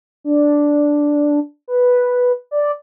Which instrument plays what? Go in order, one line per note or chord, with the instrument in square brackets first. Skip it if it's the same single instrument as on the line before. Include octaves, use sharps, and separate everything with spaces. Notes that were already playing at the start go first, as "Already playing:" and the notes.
[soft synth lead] D4
B4
D5